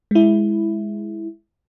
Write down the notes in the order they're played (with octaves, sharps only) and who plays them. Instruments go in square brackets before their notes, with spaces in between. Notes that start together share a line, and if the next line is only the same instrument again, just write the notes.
[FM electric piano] G#3 E4